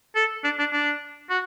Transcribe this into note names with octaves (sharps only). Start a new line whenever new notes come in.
A4
D4
D4
D4
F#4